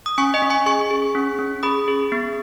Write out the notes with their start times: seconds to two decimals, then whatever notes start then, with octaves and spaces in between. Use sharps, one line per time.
0.06 D#6
0.18 C#4 G#5 C#6
0.34 D#5 G#5
0.42 C#4
0.50 G#5 C#6
0.66 G#4 G#5 C#6
0.91 G#4
1.15 C#4
1.39 C#4
1.63 G#4 B5 D#6
1.88 G#4
2.12 B3